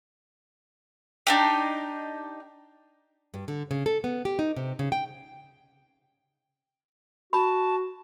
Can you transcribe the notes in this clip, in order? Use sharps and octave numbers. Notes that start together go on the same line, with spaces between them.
D4 D#4 G4
G2
D3
C#3
A4
B3
G4
D#4
C3
C#3
G5
F#4 A5 B5